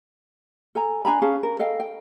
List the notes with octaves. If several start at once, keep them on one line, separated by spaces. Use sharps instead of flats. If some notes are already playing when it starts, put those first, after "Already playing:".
A4 G#5 A#5
D4 G#5 A#5 B5
C#4 G#4 F5 A5
A#4
A4 D#5 F5 G5
G5